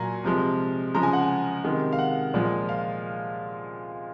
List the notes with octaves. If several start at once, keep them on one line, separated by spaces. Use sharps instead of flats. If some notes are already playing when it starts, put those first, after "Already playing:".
Already playing: A#2 F#3 G#5 A#5
C3 F3 G#3
C#3 F3 G#3 A#5
G#5
F#5
G#5
C3 D#3 G#3
F5
F#5
A#2 F3 G#3
F5